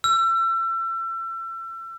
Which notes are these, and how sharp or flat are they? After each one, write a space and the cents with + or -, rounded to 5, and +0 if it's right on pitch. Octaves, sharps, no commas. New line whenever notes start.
E6 +35